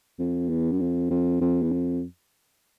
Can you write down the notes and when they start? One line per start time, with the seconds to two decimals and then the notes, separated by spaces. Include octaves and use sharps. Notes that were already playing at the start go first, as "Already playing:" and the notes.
0.19 F2
0.49 E2
0.72 F#2
0.80 F2
1.10 F2
1.41 F2
1.62 E2
1.72 F2